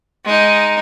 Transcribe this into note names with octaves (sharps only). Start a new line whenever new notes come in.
G#3 D#4